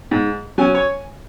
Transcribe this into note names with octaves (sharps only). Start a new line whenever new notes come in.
G#2
F#3 C#4 G#5
C#5